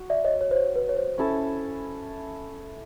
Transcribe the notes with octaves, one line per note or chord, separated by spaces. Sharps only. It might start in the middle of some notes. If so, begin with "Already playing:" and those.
Already playing: F#4
D5 E5
C#5 D#5
C#5
C5
C#5
B4
C#5
C5
C#4 E4 A4